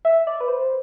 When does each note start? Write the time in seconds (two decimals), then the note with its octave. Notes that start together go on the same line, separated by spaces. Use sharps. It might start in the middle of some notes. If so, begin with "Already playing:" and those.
0.05 E5
0.27 D5
0.40 B4
0.48 C5